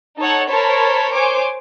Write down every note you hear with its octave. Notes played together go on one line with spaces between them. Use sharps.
D#4 A4 C#5 F#5
A#4 C5 C#5 A5 B5
C5 C#5 G#5 D6